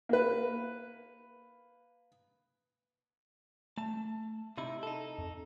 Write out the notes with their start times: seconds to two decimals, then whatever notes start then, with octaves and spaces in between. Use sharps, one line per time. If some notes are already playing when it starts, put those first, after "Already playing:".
0.09 A#3 B4
3.78 A3 A5
4.58 C3 D#4 E4
4.83 D#4 A4
5.18 F2